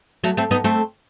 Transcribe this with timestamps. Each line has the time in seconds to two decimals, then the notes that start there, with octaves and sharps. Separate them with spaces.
0.24 F#3 A3
0.37 A3 C4
0.51 B3 D#4
0.64 A3 C4